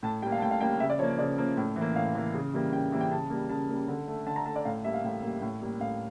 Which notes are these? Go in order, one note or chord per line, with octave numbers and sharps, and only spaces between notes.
A2 A5
G3 A#3 G5
F5
A5
A2 G5
F5
G3 A#3 G5
C#3 E5
D5
F3 A#3 C#5
C#3 D5
F3 A#3
A2
E3
A#3
A2 F5
E3 A#3
C#3
E3 G3 A#3
C#3 G5
E3 G3 A#3
G5
C#3 A5
G3 A#3
C#3 A5
G3 A#3
D3
A3
D3 A5
A#5
A3 A5
D5
A2 F5
G3 A#3 E5
F5
A2
G3 A#3
A2
G3 A#3
A2 F5